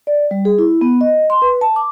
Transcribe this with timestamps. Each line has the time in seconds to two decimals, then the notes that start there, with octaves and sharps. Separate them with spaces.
0.07 D5
0.31 G3
0.45 G#4
0.59 E4
0.81 B3
1.01 D#5
1.30 C6
1.42 B4
1.61 A5
1.76 D6